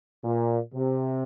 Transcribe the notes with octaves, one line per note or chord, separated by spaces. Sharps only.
A#2
C3